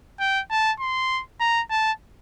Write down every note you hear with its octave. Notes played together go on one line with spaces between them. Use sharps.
G5
A5
C6
A#5
A5